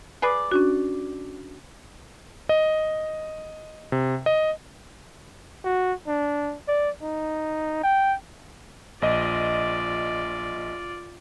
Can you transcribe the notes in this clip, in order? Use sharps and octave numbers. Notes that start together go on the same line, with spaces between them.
G#4 B4 D5
C#4 D4 F#4
D#5
C3
D#5
F#4
D4
D5
D#4
G5
A#1 F4 D5 D#5